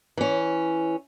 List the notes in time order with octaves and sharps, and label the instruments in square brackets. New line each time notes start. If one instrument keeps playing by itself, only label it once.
[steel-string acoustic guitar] E3 C#4